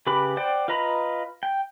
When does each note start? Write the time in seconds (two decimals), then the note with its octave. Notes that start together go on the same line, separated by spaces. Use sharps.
0.07 C#3 G4 B4 B5 D6
0.37 C5 D5 F#5 G5
0.68 F4 B4 D#5 A#5 B5
1.43 G5